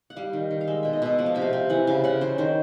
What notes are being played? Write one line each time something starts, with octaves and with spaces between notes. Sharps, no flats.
F#5
G3 F5
D#3
D#3
F5
G#3 E5
B2 E5
D#5
B2 E5
F3 F#5
F5
C3 E5
F5
C3
E3 F#5
C#3 F5
C#3 F#5
F#3 C5
D#3 C5